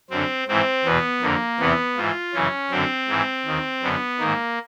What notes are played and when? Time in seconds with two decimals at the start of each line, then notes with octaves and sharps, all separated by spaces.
0.10 F#2 D3 C4
0.48 G#2 E3 C4
0.84 E2 B2 B3
1.22 F2 D3 A#3
1.60 E2 C3 E3 B3
1.97 G#2 E3 F4
2.33 F#2 C#3 E3 C#4
2.71 F#2 D3 C4
3.08 G#2 E3
3.45 D#2 D#3
3.82 F#2 D3 B3
4.20 G#2 D#3 A#3